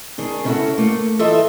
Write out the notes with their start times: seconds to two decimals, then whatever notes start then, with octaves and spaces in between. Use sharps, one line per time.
0.18 D#3 D4 G#4
0.44 C#3 C#4 D#4 E4 F#4 A4
0.78 A3 A#3
1.19 E3 F4 A4 D#5 E5